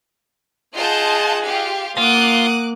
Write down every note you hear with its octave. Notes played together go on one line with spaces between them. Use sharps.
F4 G#4 D#5 F#5 A5 G6
F4 G4 F5
A#3 F4 F#5 D6 D#6 F#6